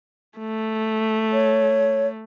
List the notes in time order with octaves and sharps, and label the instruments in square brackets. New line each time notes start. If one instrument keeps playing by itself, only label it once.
[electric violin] A3
[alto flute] C#5